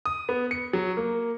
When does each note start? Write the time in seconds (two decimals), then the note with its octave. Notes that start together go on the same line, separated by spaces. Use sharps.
0.05 D#6
0.29 B3
0.51 C#7
0.73 F#3
0.97 A#3